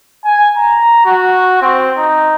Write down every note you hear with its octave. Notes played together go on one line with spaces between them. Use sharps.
G#5
A#5
F#4
C4
D#4